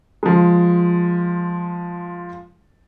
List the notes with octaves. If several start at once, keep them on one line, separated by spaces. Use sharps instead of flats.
F3 G#3